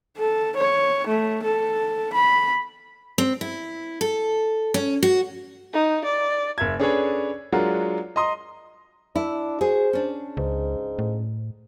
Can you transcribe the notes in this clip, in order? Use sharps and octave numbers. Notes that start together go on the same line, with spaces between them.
A4
C#5
A3
A4
B5
C4
E4
A4
C#4
F#4
D#4
D5
F#1 E5 G#6
C#4 D4 G#4 A4 B4 C#5
F#3 G#3 D4 F4 F#4 A#4
D#5 A#5 C6 D#6
D4 E4
F#4 G#4 C5
C#4 D4
C#2 G#2
A2